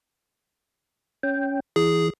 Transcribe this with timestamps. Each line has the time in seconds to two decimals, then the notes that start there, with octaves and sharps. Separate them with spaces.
1.23 C#4 G5
1.76 E3 G#4